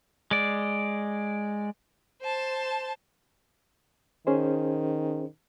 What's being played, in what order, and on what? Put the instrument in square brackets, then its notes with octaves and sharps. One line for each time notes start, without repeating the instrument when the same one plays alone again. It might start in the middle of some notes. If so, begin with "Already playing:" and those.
[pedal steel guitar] G#3 D5
[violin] C5 A5
[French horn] D#3 [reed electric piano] C#4 G#4 C5